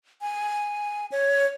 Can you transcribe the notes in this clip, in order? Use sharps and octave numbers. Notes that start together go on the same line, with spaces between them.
G#5
C#5